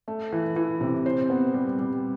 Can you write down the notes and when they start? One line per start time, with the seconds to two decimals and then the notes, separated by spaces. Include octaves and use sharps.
0.08 A3
0.32 E3
0.56 E3
0.81 C3
1.06 C5
1.30 B3
1.54 G3
1.79 G3